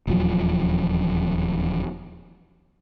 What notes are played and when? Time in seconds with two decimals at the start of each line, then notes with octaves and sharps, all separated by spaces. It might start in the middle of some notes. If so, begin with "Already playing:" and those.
0.07 D#1 E2 F3 F#3